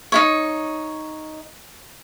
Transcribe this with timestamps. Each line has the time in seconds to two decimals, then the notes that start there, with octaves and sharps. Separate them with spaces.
0.12 D#4 E4 C#5